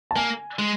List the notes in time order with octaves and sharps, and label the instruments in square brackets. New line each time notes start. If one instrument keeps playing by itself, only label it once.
[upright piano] A5
[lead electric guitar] A#3 [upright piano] G#5
[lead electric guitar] G#3